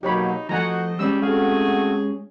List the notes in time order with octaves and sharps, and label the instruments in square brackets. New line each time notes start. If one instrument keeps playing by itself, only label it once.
[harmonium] B2 F#3 A#3 [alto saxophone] D#4 [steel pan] G4 C#5 B5
[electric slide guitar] F3 A3 [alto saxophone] F#4 [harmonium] C5 D#5 [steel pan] F#5 G#5 A#5
[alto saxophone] G3 [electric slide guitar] G#3 C#4 G4 [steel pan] E6
[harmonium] A3 C4 F#4 [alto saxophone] G#4 [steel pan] F5